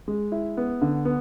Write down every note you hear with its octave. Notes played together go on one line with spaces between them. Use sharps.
G#3
E4
B3
D3
B3